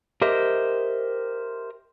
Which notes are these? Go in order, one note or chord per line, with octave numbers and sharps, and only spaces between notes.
G4 A#4 C5 D#5 E5